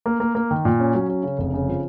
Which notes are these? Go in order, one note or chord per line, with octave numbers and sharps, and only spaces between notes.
A#3
A#3
A#3
D#3
A#2
C#4
F#3
C#4
C#3
F1
C#3
F3